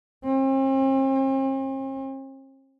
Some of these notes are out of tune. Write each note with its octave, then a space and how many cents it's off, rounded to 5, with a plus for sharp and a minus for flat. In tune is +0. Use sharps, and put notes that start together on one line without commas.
C4 +45